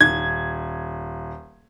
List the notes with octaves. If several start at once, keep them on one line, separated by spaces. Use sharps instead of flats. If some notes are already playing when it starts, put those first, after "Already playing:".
D#1 G#6